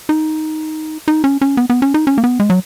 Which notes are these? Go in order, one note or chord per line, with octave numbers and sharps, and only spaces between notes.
D#4
D#4
C#4
C#4
B3
B3
C#4
D#4
C#4
A#3
B3
G#3
F#3